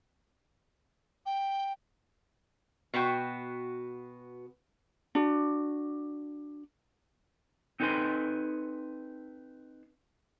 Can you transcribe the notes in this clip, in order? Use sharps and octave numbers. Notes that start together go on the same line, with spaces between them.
G5
B2 B3 F#4 G5
D4 F#4
C4 D#4 A4 B4 G#5 C6